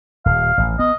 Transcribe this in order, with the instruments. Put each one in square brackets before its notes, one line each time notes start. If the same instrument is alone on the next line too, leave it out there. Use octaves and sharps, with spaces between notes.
[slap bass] D#1 [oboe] F5
[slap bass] A1
[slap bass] B3 [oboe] D#5